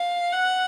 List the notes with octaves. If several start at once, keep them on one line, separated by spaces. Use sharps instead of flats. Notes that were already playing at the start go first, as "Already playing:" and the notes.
Already playing: F5
F#5